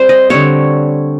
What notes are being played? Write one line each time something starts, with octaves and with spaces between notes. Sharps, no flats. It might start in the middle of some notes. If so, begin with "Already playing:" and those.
Already playing: G3 C4 C5
D#5
D3 G3 C4 C#5